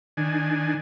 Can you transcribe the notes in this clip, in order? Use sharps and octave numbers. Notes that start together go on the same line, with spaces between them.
D#3 D4 G#5